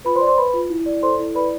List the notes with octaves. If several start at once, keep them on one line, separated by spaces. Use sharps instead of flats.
F4 B4 B5
C5 C6
D5
C5 C6
B4 B5
F4
E4
D5
A4 C5 C6
E4
B4 D5 B5